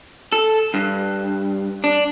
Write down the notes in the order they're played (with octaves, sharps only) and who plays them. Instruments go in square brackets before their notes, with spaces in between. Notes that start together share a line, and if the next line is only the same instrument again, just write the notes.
[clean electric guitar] A4
G2
D4